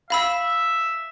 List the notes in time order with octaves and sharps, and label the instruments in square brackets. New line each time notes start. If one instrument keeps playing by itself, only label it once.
[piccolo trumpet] E5 [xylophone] F5 B5 E6